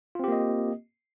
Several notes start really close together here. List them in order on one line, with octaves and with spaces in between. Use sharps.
F4 C4 G4 A#3 D#5